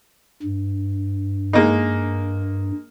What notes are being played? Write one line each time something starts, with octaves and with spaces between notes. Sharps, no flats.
G2
G#3 A#3 D#4